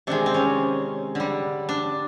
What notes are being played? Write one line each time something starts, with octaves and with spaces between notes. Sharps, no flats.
C3 D#3 G#3 D4
C4
C#4
D3 G3
D4